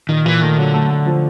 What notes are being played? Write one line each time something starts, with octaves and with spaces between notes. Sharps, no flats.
A#2 D#3
A#2 E3
D#3 A3
D3 F#3
A3
A3
F3